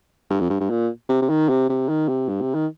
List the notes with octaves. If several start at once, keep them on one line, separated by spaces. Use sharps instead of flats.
G2
F2
G2
G2
A#2
C3
C3
D#3
C3
C3
D#3
C3
G2
C3
D#3